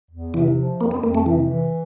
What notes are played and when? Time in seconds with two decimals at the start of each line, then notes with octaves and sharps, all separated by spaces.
0.11 E2
0.34 C3 E3
0.57 F3
0.80 F2 A#3
0.91 B3
1.03 F2 A#3
1.15 A3
1.26 C3 E3
1.49 E3